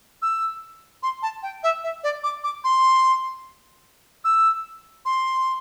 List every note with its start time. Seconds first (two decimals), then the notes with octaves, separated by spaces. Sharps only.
0.22 E6
1.03 C6
1.22 A5
1.43 G5
1.63 E5
1.84 E5
2.04 D5
2.23 D6
2.44 D6
2.64 C6
4.24 E6
5.05 C6